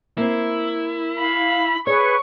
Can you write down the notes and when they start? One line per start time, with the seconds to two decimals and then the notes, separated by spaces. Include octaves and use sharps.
0.18 A#3 C4 E4
1.19 F5 B5
1.87 G#4 B4 C#5 C#6